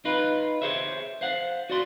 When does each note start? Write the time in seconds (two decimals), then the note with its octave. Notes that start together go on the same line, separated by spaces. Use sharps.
0.05 D#4 F4 B4
0.62 G4 G#4 C5 C#5 E5
1.21 C5 F5 F#5
1.70 F#4 D5 C6